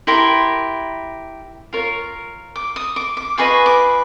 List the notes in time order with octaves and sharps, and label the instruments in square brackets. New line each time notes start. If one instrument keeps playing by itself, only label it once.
[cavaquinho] E4 G4 A#4 C6
F4 A#4 C#5
D6
D#6
D6
D6
F4 G#4 B4 D#5 C#6
D6